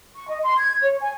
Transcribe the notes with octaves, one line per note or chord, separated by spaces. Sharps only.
C#6
D#5
C6
G#6
C#5
G#5